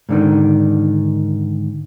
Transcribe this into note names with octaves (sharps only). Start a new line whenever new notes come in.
G#2 D3 D#3